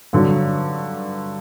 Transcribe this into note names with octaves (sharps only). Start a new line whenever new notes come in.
G2 D3 F#3